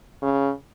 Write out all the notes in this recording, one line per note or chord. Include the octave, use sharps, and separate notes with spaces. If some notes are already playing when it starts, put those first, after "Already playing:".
C#3